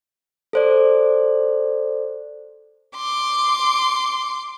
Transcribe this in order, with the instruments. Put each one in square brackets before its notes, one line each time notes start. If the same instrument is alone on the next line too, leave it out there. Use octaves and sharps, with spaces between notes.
[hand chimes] A4 C5 D5
[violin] C6 D6